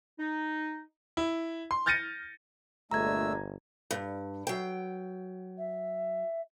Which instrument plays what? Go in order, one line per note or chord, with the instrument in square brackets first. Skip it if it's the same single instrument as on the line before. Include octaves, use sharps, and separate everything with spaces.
[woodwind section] D#4
[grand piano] E4
C6
F6 G6 A6 A#6 C#7 D#7
[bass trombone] G1 [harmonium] A#2 G#3 D4 [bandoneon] A3 E6 [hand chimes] A#5 G#6
[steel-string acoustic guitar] G2
F#3 G5
[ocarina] E5